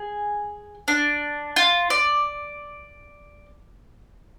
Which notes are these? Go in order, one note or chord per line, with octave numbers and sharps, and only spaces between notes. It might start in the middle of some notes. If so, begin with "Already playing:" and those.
Already playing: G#4
D4
F4
D5